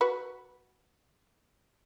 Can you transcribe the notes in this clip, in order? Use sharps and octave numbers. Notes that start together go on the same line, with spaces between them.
F#4 B4